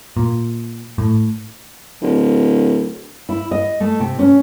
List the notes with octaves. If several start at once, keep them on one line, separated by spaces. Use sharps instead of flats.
A#2
A2
D1
E4
D#5
A3
C3
C#4